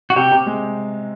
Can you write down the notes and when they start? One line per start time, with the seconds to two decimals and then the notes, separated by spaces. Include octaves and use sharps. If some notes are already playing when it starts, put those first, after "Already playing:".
0.10 F#4
0.16 C3 G4
0.32 C3
0.47 G#3